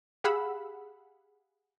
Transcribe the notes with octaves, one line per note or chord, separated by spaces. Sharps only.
G4 G#4 F5 F#5 B5 E6